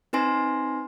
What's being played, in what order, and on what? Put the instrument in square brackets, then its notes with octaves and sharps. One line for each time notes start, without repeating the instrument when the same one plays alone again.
[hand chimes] C4 D#4 B4 G#5 C6 A#6